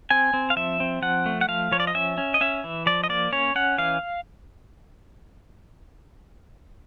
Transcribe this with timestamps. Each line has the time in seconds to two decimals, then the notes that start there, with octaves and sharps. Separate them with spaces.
0.10 C4 G#5
0.34 C4
0.50 F5
0.56 F3 E5
0.80 C4
1.02 F3 F#5
1.26 A3
1.41 F#5
1.48 F3 F5
1.72 F3 C#5
1.80 D5
1.87 D#5
1.95 C#4 E5
2.18 C#4
2.34 D#5
2.41 C#4 E5
2.64 E3
2.86 F3 D5
3.04 D#5
3.09 A#3 D5
3.32 C#4 C#5
3.55 C#4 F#5
3.78 E3 F5